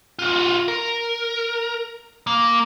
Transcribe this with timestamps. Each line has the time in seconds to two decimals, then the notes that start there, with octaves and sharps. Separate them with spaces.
0.19 F4 F#4
0.68 A#4
2.27 A#3